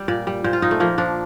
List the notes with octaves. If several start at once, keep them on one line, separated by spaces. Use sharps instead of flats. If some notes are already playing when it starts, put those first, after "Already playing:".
Already playing: G3
A#2 D5
G3
A#2 C5
F4
A#2 D#4
A3
F3 A#3
F3 D4